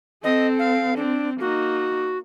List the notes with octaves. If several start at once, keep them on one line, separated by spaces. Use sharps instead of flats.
C4 A4 D#5
F5
C4 D4
A#3 D#4 F#4